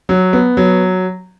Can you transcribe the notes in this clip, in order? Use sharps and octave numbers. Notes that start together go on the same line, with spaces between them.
F#3
B3
F#3